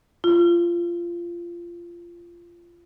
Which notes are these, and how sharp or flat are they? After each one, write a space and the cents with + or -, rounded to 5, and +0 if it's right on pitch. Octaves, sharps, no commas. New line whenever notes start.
F4 -20